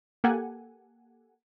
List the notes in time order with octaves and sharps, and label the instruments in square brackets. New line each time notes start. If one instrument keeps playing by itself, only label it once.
[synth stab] A#3 G4 A4 F#5 G#5